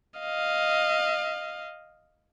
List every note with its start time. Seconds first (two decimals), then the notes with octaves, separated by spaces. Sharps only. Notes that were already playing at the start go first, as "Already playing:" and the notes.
0.20 D#5 F5